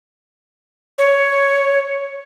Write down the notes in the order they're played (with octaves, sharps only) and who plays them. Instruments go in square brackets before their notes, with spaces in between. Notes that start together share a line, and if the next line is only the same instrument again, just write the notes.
[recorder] C#5